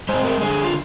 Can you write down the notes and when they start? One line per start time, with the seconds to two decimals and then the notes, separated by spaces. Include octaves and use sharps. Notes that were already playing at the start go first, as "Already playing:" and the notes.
0.09 G#3 C4 C5
0.25 A#4
0.41 D3 G#4
0.64 F4